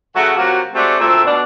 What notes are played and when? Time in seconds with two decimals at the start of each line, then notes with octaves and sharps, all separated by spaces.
0.16 C#3 F#3 A3 F#4 A4 F#5
0.37 C3 F#3 A#3 F4 F#4
0.74 G#3 A3 C4 D4 F#4 G4
1.00 D2 A#2 A3 C4 A4 E5
1.26 B2 D4